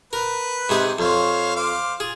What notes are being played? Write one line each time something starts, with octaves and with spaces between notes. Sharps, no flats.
A#4 B4
G#2 C3 G#4
F2 C5 C#5 F5
C5 F5 D6
F4 G#4